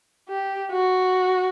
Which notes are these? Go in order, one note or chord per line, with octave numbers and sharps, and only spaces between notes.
G4
F#4